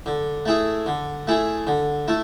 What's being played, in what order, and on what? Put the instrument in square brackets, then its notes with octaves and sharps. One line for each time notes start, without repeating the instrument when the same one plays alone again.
[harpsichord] D3
A3 E4 G#4
D3
A3 E4 G#4
D3
A3 E4